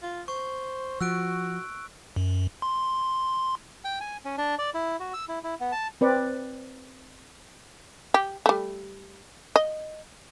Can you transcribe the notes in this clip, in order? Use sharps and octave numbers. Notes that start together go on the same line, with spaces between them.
F4
C5 C#6
F3 F#4 E6 F#6 D7
F#2
C6
G5
G#5
C#4
D4
D5
E4
F#4
E6
E4
E4
B3
A5
C4 B4 D5
G4
G3 A3
D#5